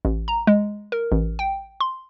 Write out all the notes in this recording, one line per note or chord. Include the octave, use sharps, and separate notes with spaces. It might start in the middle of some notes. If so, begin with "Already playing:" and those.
A1
A#5
G#3
A#4
A1
G5
C6